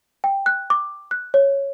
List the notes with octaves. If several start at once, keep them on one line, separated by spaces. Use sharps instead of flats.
G5
F#6
D6
F#6
C#5